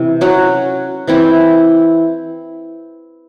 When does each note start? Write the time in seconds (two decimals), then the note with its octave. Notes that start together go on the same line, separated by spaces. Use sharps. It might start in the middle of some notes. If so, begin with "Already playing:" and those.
Already playing: C3 E3
0.21 F#3 C#4 F#4
1.07 E3 C4 E4